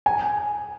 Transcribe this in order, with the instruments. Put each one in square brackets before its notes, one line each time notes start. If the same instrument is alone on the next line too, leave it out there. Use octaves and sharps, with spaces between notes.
[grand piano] G#5